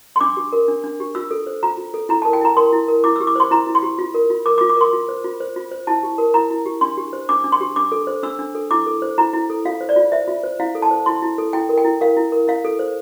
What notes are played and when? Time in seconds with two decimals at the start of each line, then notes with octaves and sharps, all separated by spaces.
0.16 C6
0.21 D4 D6
0.37 G4
0.53 A#4
0.68 D4
0.84 D4
1.00 G4
1.15 F4 E6
1.31 A4
1.47 C5
1.63 F4 A#5
1.78 F4
1.94 A4
2.09 E4 A#5
2.22 A5
2.25 A#4
2.33 G5
2.41 E4 A#5
2.57 A#4 C6
2.73 E4
2.88 A#4
3.04 E4 D6
3.16 E6
3.20 G4
3.27 D6
3.36 C5 C6
3.51 E4 A#5
3.67 E4
3.75 C6
3.83 G4
3.99 F4
4.14 A#4
4.30 F4
4.46 A#4 D6
4.58 D6
4.61 F4
4.69 D6
4.77 A#4 C6
4.93 F4
5.09 C5
5.24 F4
5.40 C5
5.56 F4
5.71 C5
5.87 E4 A5
6.03 G4
6.18 A#4
6.34 E4 A#5
6.51 E4
6.66 G4
6.81 D4 C6
6.97 G4
7.13 C5
7.29 D4 D6
7.44 D4
7.52 C6
7.61 G4
7.76 D4 D6
7.92 A4
8.07 C5
8.23 D4 E6
8.39 D4
8.55 A4
8.71 E4 D6
8.86 A4
9.02 C5
9.18 E4 A#5
9.33 E4
9.50 A4
9.65 F4 F5
9.81 C5
9.89 D5
9.96 F4
10.12 C5 E5
10.28 F4
10.43 C5
10.60 E4 F5
10.75 A4
10.82 A5
10.91 C5
11.06 E4 C6
11.22 E4
11.38 A4
11.53 E4 G5
11.69 A#4
11.78 G5
11.85 E4
12.01 A#4 F5
12.17 E4
12.32 A#4
12.48 E4 F5
12.65 A4
12.79 C5